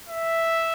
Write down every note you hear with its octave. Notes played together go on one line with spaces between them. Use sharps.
E5